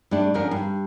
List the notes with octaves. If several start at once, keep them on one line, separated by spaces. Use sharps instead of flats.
G2 A3 D4
D3 F3 C#4 D4 A#4
G2